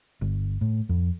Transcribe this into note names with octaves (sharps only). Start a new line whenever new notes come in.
G1
A2
F2